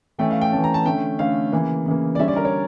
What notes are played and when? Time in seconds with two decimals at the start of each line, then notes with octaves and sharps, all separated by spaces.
0.18 E3 A3 C#4 G5
0.31 F5
0.41 G5
0.52 E3 A3 C#4 A5
0.64 A#5
0.74 A5
0.85 D3 A3 C#4 G5
1.19 D3 A3 C#4 F5
1.52 C#3 E3 A#3
1.86 C#3 E3 A#3
2.15 D5
2.19 D3 G3 C#4 E5
2.28 D5
2.36 A#4
2.45 C#5